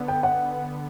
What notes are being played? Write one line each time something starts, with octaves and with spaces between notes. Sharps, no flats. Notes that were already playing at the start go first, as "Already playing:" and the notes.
Already playing: D3 B3
G5
F#5